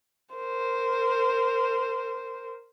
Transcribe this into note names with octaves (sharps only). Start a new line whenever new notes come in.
A#4 C5